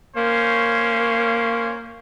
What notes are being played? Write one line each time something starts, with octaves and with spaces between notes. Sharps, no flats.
A#3 C#4 C5 C#5